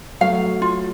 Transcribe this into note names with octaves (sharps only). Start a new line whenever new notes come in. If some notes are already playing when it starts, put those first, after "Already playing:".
F#3 A3 F5
F4